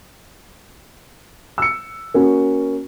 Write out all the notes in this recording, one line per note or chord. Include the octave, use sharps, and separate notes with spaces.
E6 C#7
A#3 C#4 F#4